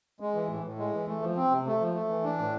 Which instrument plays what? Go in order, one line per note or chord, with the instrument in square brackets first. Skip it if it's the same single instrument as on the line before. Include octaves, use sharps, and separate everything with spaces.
[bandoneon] G#3
E3
A2
A2
G#3
E3
A3
F3
C4
C3
A3
F3
A3
E3
D4
A2